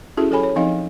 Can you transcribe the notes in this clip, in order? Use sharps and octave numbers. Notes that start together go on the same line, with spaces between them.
C#4 E4 F#4 G#4 A4 E5
F#3 G4 A4 C#5 G#5 B5
C#5
F3 C4 D#4 D#5 F5